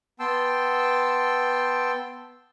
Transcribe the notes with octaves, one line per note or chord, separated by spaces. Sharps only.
B3 G5 A5 C6 E6